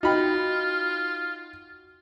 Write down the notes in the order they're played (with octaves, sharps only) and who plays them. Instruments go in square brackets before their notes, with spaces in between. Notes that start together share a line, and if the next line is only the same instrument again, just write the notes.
[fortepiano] D#4 B5 [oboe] F4 [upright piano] F#4 G5